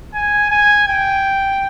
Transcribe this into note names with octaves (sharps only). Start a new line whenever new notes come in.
G#5
G#5
G5